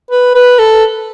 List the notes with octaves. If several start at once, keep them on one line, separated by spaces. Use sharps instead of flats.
B4
B4
A4